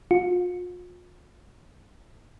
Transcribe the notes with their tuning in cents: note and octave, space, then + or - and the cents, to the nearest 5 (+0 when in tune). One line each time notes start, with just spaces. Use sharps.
F4 +40